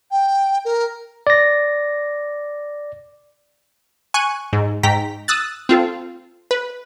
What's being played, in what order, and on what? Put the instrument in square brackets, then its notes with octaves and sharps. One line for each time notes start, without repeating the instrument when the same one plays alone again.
[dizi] G5
A#4
[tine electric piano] D5 A#6
[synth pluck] G#5 C#6 F#6 D#7
G#2
G#2 G5 A#5 B6
D#6 E6 F#6 A6
C4 F4 A4
B4